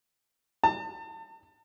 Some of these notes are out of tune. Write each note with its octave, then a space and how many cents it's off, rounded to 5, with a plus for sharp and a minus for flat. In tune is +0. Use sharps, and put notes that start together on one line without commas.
A5 +35